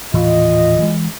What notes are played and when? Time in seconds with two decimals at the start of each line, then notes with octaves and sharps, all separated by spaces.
0.14 D#1 A2 E3 F4 D#5
0.79 E3 G3 G#3